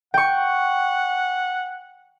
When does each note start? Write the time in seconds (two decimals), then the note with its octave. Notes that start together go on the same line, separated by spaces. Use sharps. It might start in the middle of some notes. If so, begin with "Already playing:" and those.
0.14 F#5 G5 C#6